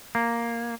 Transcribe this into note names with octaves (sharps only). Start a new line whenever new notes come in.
A#3